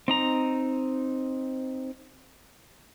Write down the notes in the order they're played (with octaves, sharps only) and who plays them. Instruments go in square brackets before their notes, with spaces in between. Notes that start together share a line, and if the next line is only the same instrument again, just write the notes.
[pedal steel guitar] C4 D#4 A#5